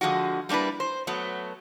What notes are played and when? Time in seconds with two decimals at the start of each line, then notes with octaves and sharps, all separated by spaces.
0.01 D3 F3 G#3 F#4
0.49 G3 A#3 D4 E4 B4
0.80 C5
1.07 F#3 A3 B3